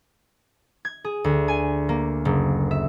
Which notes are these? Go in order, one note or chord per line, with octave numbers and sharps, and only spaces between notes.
G#6
G#4
D2
G#5
A#3
F#1
E5